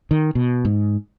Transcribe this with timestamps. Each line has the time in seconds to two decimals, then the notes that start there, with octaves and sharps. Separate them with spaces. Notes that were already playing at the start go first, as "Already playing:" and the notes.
0.11 D#3
0.35 B2
0.65 G#2